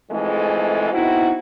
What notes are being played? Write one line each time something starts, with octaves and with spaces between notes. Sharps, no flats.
F2 G#2 E3 G#3 A3
B3 C4 D#4 E4 F#4